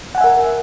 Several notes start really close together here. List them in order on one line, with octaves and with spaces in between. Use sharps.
F#5 G#5 E5 A#4